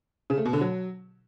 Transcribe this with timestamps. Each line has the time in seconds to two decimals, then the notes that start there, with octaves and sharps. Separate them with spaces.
0.30 C#3
0.38 A3
0.45 B2
0.53 D3
0.61 F#3